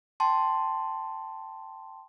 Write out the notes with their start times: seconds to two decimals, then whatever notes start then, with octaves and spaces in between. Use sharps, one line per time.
0.20 G5 A5 C6